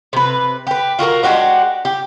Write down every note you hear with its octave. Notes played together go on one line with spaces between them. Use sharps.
C3 B4
G4 B4
F4 F#4 G#4 A#4
G#3 D4 F#4 G4
G4